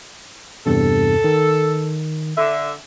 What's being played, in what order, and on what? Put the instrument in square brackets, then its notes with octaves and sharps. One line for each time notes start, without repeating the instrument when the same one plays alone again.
[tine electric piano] E2 G2 C3 [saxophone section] A4
[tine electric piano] D#3
[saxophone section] D3 E5